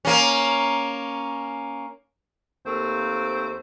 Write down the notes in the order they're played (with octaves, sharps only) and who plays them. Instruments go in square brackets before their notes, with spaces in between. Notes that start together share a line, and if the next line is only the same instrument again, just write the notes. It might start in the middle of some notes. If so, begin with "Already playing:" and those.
[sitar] A#3 C#4
[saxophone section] D#2 A3 A#3 C4 C5